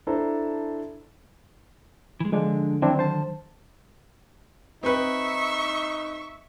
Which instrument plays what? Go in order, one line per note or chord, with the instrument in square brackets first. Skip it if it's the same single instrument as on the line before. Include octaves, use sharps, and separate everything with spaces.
[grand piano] D4 E4 A4 C5 A5 A#5
[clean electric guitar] E3 G#3
[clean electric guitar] D3 [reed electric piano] F3 G#3 D4
[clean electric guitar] D3 D#3 F#3 [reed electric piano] C4 D4 E4
[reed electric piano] C5 A5
[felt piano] C4 B4 [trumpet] D#4 [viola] E5 C#6